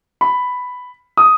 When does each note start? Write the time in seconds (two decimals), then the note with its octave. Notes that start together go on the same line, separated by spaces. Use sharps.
0.21 B5
1.17 D#6